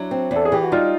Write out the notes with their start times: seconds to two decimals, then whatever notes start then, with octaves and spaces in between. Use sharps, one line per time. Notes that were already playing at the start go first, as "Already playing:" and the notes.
Already playing: F#3 D4 E4
0.11 C4
0.31 E2
0.36 A4
0.45 G#4
0.52 E3 G4
0.63 F#4
0.72 G3 D#4 F4